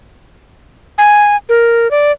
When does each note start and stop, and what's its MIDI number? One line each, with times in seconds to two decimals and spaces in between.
0.98 1.36 80
1.49 1.90 70
1.91 2.12 74